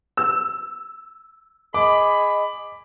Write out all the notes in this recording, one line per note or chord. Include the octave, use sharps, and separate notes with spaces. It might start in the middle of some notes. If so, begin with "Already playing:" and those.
E6
G#4 D#5 B5 D6